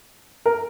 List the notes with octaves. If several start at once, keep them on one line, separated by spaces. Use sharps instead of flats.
A#4